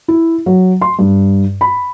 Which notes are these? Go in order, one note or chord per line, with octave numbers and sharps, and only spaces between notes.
E4
F#3
C6
G2
B5